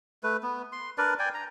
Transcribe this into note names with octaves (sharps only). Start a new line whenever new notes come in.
A3 B4
B3
C6
D4 A#4 B4 D5
D5 G5 G#5
A#5